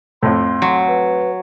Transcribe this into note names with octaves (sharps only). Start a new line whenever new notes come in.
F2 A2 C6
F#3
B4